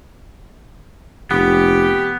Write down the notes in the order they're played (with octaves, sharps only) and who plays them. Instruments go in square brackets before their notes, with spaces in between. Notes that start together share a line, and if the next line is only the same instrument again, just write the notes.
[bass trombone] F1 [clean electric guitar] B3 [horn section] G4